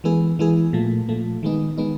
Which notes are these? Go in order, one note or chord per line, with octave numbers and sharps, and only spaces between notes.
E3 G#3 B3 E4 G#4
E3 G#3 B3 E4 G#4
A#2 F3 A3
A#2 F3 A3
D#3 G#3 B3 D#4
D#3 G#3 B3 D#4